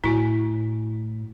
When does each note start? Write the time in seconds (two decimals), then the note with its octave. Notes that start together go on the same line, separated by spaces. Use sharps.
0.04 A2 E4 F#4 G#5